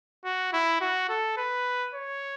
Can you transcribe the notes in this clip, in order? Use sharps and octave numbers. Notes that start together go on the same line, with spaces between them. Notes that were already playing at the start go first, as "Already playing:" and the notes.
F#4
E4
F#4
A4
B4
C#5